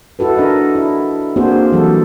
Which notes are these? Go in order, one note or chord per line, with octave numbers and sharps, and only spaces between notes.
E4 F#4 A4 B4
D4 A#4 D#5
E4
A#3 C4 D4 F#4 G#4 C5
E3 F#3 G3 A4